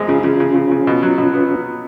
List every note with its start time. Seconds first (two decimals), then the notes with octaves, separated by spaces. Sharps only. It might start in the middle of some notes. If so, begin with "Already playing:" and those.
Already playing: F#2 F3 G#3
0.08 C#3 C#4 F4
0.23 C#3 C#4 F4
0.40 C#3
0.55 C#3
0.71 C#3
0.87 B2
1.03 F#3
1.18 B2
1.34 B3